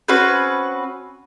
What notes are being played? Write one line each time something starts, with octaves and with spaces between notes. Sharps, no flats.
C4 C#4 F#4 B4